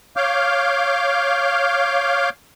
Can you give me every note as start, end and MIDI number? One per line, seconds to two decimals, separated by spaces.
0.17 2.30 73
0.17 2.30 77
0.17 2.30 86
0.17 2.30 89
0.17 2.30 91